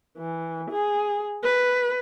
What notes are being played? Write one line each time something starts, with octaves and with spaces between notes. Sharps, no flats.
E3
G#4
B4